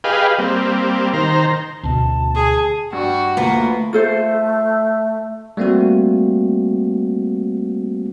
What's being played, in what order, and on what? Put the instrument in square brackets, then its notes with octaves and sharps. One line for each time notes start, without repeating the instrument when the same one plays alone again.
[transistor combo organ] G4 G#4 B4 D#5 F5
G3 A#3 C4
D#3 C5 A#5
[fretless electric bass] D2 B2 [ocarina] A5
[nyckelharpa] G#4
[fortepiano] G2 [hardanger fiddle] F#4
[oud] D2 B3 [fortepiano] F3 [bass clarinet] A#3
[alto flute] A3 [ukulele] F4 A4 C5
[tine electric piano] G3 A3 A#3 C4 F#4